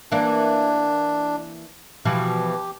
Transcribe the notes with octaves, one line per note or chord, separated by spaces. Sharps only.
E3 A#3 D4
B2 E3 F3 G4